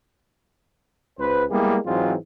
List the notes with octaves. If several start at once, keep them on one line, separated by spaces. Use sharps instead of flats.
C#2 B4 C5
G3 G#3 A#3 B3 E4 G#4
G#2 E3 F#3 G#3 C4 F4